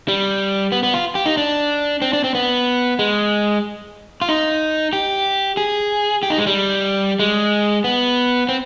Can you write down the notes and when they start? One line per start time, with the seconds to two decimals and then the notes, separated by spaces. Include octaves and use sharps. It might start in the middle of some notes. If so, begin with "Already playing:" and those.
0.08 G3
0.72 B3
0.83 B3
0.94 F4
1.15 G4
1.26 D#4
1.37 D4
2.02 C4
2.13 D4
2.24 C4
2.35 B3
2.99 G#3
4.21 F4
4.29 D#4
4.93 G4
5.57 G#4
6.23 G4
6.30 D#4
6.38 G#3
6.47 G3
7.19 G#3
7.84 B3
8.49 C4